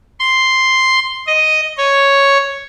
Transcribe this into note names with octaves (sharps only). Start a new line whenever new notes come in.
C6
D#5
C#5